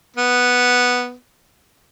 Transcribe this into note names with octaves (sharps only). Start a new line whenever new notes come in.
B3